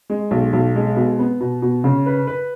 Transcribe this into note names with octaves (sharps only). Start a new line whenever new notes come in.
G#3
B1
B1
G#3
B2
B3
B2
B2
C#3
B4
B4